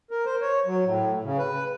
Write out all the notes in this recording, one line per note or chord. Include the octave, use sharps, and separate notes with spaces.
A#4
C5
C#5
F#3
A2
C#3
B4